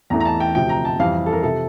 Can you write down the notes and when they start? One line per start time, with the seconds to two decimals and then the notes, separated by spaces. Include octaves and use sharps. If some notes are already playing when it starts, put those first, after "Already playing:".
0.10 E2 E3 A3 A#5
0.20 A#5
0.25 A5
0.40 G5
0.55 D2 C3 F3 G5
0.69 A#5
0.85 A5
0.99 F2 E3 G3 F5
1.26 A4
1.33 A#4
1.43 C3 F3 A4